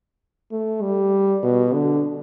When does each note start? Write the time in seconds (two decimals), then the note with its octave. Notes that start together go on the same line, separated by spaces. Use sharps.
0.52 A3
0.82 G3
1.43 B2
1.73 D3